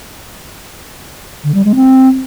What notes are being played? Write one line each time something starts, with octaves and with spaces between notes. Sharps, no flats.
D3
G3
G#3
C4